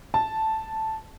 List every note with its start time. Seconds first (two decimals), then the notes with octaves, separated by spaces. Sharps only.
0.14 A5